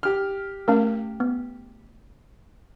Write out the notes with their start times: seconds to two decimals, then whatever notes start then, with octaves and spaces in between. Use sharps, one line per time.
0.03 G4 F6
0.68 A3 C#4 A#4 F5
1.20 B3